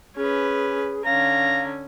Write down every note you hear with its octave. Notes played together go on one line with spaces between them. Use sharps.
C#4 G#4 B4
D3 C#4 F5 A#5